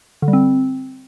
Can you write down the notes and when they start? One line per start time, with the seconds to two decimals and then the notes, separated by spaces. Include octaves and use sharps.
0.22 D3
0.28 G3
0.33 C4